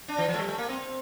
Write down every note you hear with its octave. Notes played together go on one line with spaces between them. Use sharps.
D4
E3
F3
A3
G3
A3
A#3
C4